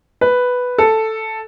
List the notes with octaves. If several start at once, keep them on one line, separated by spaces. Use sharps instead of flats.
B4
A4